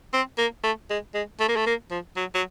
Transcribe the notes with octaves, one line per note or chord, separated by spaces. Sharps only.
C4
A#3
A3
G#3
G#3
A3
A#3
A3
A#3
F3
F#3
F#3